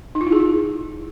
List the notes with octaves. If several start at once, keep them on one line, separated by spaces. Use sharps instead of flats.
D#4
F4
E4
G#4